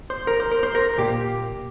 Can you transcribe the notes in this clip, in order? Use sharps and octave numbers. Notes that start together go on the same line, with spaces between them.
C5
A#4
C5
A#4
C5
A#4
A#2 A#3 G4